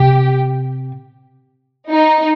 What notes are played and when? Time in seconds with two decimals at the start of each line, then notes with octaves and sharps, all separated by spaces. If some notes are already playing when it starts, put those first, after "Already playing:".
Already playing: C3 G4
1.89 D#4